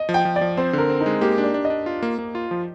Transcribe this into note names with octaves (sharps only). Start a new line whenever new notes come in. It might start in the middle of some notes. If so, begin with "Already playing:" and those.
Already playing: D#5
F3
G5
F3
D5
F3
C4 C5
D3 A#4
C4
D#4
G#3
A#3 G4
D4
D5
D4
D#5
D4
F4
A#3
A#3
F4
F3